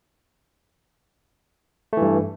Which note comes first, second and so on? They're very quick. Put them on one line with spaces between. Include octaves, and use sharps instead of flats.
A3 E3 G2